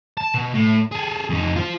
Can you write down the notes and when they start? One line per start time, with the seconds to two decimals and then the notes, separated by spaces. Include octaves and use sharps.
0.18 A5
0.34 B2
0.53 A2
0.92 G#4 A4
1.30 F2 D#4
1.56 F4 C5